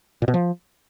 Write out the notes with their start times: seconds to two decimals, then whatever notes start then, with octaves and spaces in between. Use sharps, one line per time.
0.22 A#2
0.28 B2
0.34 F3